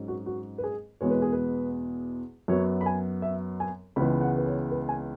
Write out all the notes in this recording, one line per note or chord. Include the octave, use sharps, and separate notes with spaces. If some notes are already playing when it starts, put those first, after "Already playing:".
Already playing: G#2 F#3 C#4
F#4
F#4
B4
G#4
E2 B2 G#3 B3 C#5
B4
G#4
B4
F#2 F#3 B3 C#5
B5
G#5
E5
G#5
C#2 C#3 E3 G#3 B3 B5
F#5
B4
C#5
B4
G#5